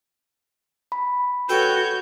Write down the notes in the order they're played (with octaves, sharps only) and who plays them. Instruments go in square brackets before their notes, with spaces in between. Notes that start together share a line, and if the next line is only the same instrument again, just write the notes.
[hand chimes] B5
[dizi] F#4 [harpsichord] A4 B4 G5 [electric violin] C#5 G6